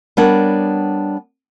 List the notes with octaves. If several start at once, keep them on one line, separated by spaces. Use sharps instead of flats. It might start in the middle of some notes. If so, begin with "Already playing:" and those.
G3 B3 D4 A#4 C#5 F#5